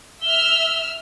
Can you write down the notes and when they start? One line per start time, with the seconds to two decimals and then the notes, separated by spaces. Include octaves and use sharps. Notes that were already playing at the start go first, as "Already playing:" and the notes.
0.22 E5 E6 F6 G7